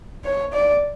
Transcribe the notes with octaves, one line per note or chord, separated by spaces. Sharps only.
C#5
D5